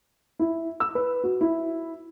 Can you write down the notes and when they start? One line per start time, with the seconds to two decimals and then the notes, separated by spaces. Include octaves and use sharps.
0.39 E4
0.80 E6
0.95 B4
1.24 F#4
1.41 E4